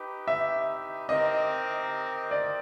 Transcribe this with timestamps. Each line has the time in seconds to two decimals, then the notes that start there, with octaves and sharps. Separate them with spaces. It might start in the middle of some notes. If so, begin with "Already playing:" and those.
Already playing: D#4 G4 B4
0.28 E5
1.09 C4 D#4 G4 A#4 D#5
2.31 D5